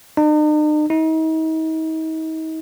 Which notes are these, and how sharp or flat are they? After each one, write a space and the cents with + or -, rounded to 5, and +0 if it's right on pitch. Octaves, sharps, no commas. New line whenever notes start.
D#4 -45
D#4 +40